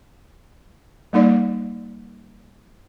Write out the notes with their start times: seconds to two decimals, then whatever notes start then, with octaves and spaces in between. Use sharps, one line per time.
1.13 G3 A#3 D#4 D5